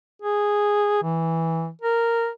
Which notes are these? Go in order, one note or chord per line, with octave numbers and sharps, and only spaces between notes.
G#4
E3
A#4